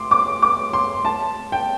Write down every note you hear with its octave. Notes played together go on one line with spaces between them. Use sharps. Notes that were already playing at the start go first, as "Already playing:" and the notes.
Already playing: C6 D6
D6
D6
C6
A5
G5